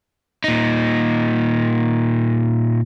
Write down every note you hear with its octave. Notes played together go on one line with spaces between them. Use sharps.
A#2 D#4